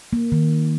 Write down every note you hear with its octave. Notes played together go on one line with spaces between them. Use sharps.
A#3
D#3